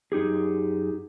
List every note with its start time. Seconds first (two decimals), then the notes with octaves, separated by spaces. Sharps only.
0.12 F#2 D#4 G4 G#4